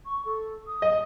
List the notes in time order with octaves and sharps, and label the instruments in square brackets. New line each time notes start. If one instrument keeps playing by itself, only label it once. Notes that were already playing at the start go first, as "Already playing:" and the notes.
[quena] C#6
A4
D#6
[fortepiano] D#5